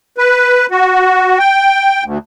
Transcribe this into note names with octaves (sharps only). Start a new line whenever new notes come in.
B4
F#4
G5
D2